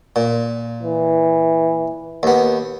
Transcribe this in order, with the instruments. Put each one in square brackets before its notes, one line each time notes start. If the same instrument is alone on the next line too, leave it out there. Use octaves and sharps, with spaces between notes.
[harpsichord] A#2
[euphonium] E3
[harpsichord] D#2 B3